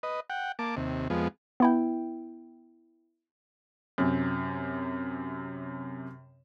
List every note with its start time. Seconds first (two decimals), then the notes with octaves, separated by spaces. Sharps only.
0.03 B4 D#5
0.30 F#5 G5
0.59 A#3 A5 D6
0.77 D#2 C3
1.10 F2 F3 G#3 B3
1.60 B3 E4 G5
3.98 F#2 C3